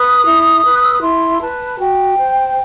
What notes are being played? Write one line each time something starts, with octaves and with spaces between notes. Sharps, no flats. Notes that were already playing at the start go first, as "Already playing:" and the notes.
Already playing: B4 D#6
E4
B4
F#6
E6
D#6
E4 C6
B4 A5
F#4 G5
C5